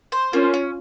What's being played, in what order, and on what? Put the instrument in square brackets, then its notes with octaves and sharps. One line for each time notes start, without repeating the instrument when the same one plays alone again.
[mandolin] C5
[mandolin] A#3 [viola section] C#4 F4
[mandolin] C#4